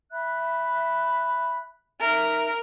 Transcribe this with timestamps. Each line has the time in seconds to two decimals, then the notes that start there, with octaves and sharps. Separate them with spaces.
0.12 E5 B5 F#6
2.00 D#4 A#4 E5